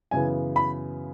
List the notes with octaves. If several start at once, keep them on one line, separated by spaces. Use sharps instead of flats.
F#2 C#3 E3 B3 G#5
B5